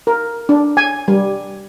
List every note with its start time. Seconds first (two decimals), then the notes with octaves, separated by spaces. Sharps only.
0.07 A#4
0.49 D4
0.77 G#5
1.08 G3